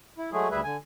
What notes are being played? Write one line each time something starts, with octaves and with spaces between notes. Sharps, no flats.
E4
F#3 G#3 A3 G#4
D2 G3 G#4 B4 E5
D3 G#5